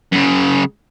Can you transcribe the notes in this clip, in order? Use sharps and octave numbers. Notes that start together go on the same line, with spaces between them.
F#2 C#3